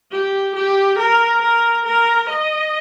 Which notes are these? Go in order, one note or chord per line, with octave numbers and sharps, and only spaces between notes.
G4
G4
A#4
A#4
A#4
D#5